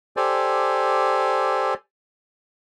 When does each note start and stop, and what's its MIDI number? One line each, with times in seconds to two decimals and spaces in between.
0.17 1.74 67
0.17 1.74 69
0.17 1.74 72
0.17 1.74 74
0.17 1.74 80